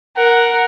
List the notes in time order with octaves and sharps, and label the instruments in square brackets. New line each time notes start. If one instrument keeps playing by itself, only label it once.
[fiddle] A#4 [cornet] F#5